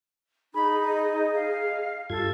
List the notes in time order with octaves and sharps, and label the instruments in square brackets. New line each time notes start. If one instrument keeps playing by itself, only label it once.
[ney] D#4 [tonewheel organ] G#4 [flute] B5
[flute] D#5
[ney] F5
[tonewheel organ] G2 F4 G#6 [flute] A4